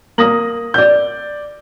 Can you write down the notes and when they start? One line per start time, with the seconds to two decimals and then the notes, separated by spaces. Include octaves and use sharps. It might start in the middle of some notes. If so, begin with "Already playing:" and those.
0.18 A#3 D#6 A#6 F#7
0.74 D5 G6